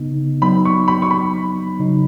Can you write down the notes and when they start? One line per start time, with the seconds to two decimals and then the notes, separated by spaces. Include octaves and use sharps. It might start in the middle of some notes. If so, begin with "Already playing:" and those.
Already playing: C#3 B3 D#4
0.42 F#3 B3 D#4 B5
0.65 C#6
0.88 B5
1.02 C#6
1.11 B5
1.79 C#3 F#3 D#4